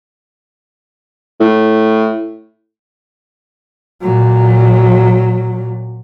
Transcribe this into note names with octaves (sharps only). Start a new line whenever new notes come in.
A2
A#2 F#3